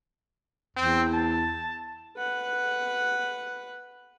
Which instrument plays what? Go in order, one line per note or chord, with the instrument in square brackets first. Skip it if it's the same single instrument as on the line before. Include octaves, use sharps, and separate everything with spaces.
[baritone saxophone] E2 [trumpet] C4
[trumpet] A5
[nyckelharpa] B4 F#5